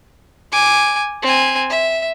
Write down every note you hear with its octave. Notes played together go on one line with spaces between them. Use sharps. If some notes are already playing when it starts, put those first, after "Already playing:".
G#5 D6
C4 G#5
E5